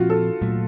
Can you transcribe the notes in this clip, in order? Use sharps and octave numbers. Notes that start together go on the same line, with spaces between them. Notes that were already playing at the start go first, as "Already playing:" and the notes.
Already playing: A#2 F3 C4 F4 F#4
A4
A#2 F#3 A3